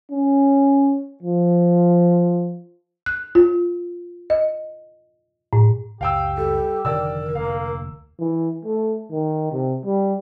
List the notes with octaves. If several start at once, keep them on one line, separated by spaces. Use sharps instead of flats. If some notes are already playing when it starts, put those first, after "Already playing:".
C#4
F3
F#6
F4
D#5
A2
F#1 C#2 G4 F5 G5 E6
G3 A4
F1 D3 D#3 A#4 D5 E6
F1 D2 A#3 F5
E3
A3
D#3
C3
G3